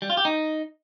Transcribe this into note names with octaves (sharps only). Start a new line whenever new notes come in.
G3
F4
G4
D#4